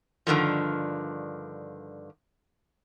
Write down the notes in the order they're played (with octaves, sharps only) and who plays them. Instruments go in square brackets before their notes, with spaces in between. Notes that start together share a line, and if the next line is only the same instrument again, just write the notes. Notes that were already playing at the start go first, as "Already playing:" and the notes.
[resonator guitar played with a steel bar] G2 D3 D#3 F3